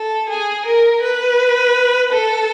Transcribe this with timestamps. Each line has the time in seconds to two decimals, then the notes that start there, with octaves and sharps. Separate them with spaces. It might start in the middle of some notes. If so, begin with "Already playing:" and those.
Already playing: A4
0.29 G#4
0.66 A#4
1.02 B4
2.13 A4